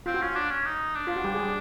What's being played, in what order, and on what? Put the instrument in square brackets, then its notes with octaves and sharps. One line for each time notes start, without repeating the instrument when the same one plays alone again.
[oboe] C4 [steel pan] F4
[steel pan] F#4
[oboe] C#4 [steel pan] F4
[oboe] D4
C#4
D#4
D4
[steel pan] F4
F#4
G3 G4
G#4
G3 G4